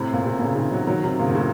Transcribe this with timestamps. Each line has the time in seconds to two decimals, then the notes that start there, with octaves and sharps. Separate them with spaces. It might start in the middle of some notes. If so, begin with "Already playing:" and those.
Already playing: A2 C3
0.13 A#2
0.26 C3
0.39 A#2 C#3
0.55 C3 D#3
0.71 D#3 F#3
0.87 D#3 F#3
1.04 C3 D#3
1.19 A#2 C#3
1.29 A#2
1.35 A2 C3